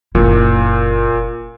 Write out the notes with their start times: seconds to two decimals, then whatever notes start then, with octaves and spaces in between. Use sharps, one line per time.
0.15 F#1 A#2 E4